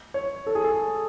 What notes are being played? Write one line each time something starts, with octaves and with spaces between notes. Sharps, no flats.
C#5
A4
G#4
A4